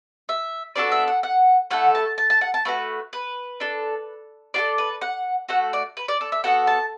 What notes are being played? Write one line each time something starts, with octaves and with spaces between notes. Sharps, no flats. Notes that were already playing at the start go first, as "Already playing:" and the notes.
E5
B3 D4 F#4 A4 D5
E5
F#5
F#5
A3 E4 A4 F#5
A5
A5
A5
F#5
A5
A3 D4 F#4 B4
B4
D4 A4
D4 F#4 A4 D5
B4
F#5
A3 F#4 A4 F#5
D5
B4
D5
A4
E5
B3 F#4 A4 F#5
A5